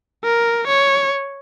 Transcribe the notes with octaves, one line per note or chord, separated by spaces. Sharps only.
A#4
C#5